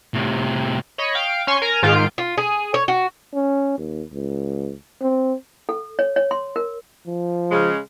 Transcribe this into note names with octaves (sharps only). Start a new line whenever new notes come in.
A2 C3
C#5 D#5 B5 C#6
F5 G5 D7
C#4 C#5 G#5 C6 C#6
A#4 G#5 A#5
G#2 D#3 F4 F5 G6 D7
F4
G#4
C#5
F#4
C#4
D#2
C#2
C4
A4
C#5
C#5
C6
A#4
F3
C#3 G#3